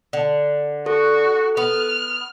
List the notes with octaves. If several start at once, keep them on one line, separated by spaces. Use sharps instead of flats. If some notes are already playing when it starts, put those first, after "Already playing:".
D3
F#4 A4
B3 F6